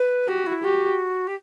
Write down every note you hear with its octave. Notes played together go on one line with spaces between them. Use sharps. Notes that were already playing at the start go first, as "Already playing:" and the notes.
Already playing: B4
F#4 G4
E4
F#4 G4
G4